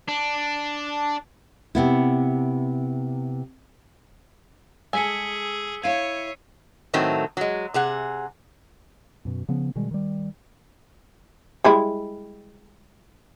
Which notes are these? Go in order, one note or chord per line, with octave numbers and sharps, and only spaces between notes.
D4
C3 B3 E4
G#3 G#4 A4 G#5 E6 B6 C#7
E4 C#5 F5 G#6 C7 D#7
A2 D#3 F#3 A3 C4
F#3 G#3
C3 G#4 F#5
F#2 B2
C#3 F3 B3 C#4
B2 D#3 G3 G#3
D#3 G3
G3 G#3 E4